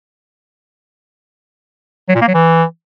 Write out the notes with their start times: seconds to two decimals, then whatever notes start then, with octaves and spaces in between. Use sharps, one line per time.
2.08 F#3
2.15 A#2
2.21 A#3
2.28 F#3
2.34 E3